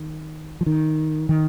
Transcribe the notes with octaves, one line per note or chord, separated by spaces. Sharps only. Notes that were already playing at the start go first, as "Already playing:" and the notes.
Already playing: D#3
F3
D#3
D#3